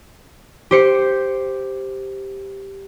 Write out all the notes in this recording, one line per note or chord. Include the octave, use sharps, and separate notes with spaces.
G4 C5 C#7